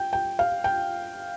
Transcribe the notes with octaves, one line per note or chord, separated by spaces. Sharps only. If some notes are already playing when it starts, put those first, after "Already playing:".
Already playing: G5
G5
F5
G5